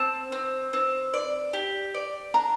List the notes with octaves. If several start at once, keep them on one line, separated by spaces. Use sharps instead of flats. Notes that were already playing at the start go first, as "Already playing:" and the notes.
Already playing: C4 A5
C4
C4
D5
G4
D5
D4 A#5